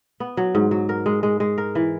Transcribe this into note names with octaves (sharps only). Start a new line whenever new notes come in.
B3
F#3
G#2
F#3
A#4
G#3
G#3
G#3
A#4
E3